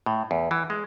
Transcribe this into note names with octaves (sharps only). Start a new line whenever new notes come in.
A2
E2
E3
G#3